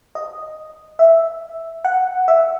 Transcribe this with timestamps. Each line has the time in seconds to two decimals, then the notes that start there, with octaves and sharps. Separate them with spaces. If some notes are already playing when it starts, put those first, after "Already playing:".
0.15 D#5
0.99 E5
1.84 F#5
2.28 E5